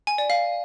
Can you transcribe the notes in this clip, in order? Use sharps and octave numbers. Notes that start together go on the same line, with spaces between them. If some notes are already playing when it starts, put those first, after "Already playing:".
G#5
D5
F5